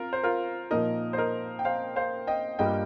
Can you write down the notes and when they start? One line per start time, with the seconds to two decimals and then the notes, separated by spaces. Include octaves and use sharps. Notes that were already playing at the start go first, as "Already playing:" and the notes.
Already playing: C4 F4 A#4
0.13 C5
0.24 F4 A#4
0.71 A#2 F3 A#3 D#4 A#4 D#5
1.13 C5
1.18 A#4 D#5
1.59 G5
1.65 C5 F5
1.96 C5 F5
2.27 D#5 G5
2.59 G2 G3 A#3 F4 D#5 G5